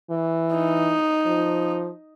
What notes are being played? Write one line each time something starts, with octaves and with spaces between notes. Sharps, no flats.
E3
D#4
F3